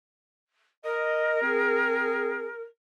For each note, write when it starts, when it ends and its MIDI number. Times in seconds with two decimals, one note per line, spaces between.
0.84 2.62 70
0.84 1.42 75
1.42 2.49 60
1.42 2.49 68